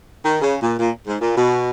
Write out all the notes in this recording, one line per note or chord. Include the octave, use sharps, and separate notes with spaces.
D#3
C#3
A#2
A#2
G#2
A#2
B2